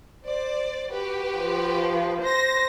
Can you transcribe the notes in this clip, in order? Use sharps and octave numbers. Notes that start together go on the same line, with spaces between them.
C5 D5
F#4 G4 B4
F3
C5 A#6